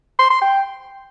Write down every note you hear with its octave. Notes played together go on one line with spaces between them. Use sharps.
C6
C6
G5